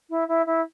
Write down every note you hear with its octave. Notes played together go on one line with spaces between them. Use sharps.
E4
E4
E4